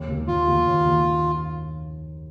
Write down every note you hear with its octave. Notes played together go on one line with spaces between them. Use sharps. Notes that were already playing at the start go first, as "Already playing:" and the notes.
Already playing: D#2
D#3 A#3 G4
D#2 F4
D#3 A#3 G4
D#2
D#3 A#3 G4